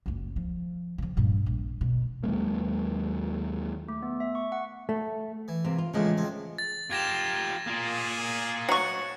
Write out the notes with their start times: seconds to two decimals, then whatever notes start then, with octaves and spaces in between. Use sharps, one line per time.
0.06 F#1 C#2
0.36 F3
0.98 C#3 F3
1.17 G2 A#2
1.46 A#1
1.81 B2
2.23 D#2 F#3 G#3 A#3
3.89 A3
4.02 B3
4.20 E5
4.35 C#6
4.52 F#5
4.89 A3
5.48 E3
5.64 C3 A#3
5.78 F4
5.94 A1 F2 A#2 C#3 G#3 A3
6.17 F2 C4
6.58 A6
6.91 F4 G4 A#4 G#6 A#6 E7
7.67 A#3 F4 G#4
8.69 F#3 F#5 C#6 C#7